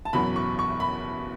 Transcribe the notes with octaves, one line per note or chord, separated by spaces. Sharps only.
A5
F#1 E2 B2 F#3 B5
C#6
C#6
B5